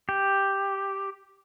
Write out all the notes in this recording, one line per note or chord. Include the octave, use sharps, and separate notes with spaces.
G4